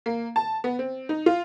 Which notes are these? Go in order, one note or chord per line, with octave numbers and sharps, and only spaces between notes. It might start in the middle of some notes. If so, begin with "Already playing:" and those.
A#3
A5
B3
C4
D#4
F4